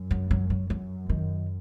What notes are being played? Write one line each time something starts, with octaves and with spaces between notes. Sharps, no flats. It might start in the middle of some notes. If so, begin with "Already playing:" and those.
Already playing: F#2
F#3
F#3
F#3
F#2 F#3
D#3